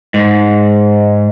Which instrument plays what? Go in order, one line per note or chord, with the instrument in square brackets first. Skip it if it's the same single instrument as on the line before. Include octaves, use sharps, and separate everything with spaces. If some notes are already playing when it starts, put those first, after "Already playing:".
[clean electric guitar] G#2